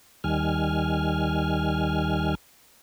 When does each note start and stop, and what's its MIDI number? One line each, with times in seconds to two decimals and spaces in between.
0.24 2.35 39
0.24 2.35 51
0.24 2.35 55
0.24 2.35 80
0.24 2.35 89